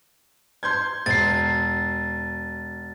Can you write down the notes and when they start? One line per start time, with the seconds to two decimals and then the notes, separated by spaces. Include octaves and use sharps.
0.63 C6 G6 G#6
1.06 E1 A6 C7